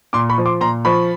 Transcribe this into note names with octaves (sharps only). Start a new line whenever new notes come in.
A#2 C6 D6
B5 C#6
F3
C6 D6
A#2 A#5 C6
F3 B5 C#6